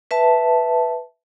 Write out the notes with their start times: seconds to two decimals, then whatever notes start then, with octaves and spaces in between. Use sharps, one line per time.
0.11 B4 E5 A5